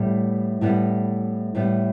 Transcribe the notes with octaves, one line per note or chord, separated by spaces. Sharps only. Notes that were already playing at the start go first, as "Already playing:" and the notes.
Already playing: A2 G3 B3
A2 G3 B3
A2 G3 B3